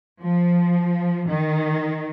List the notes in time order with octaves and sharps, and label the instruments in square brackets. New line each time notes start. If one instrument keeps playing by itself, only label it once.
[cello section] F3
D#3